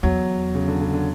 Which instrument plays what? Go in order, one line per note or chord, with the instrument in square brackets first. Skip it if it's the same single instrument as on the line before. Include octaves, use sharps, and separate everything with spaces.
[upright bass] E2 [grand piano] F#3
[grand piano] C#3
D3
C#3
D3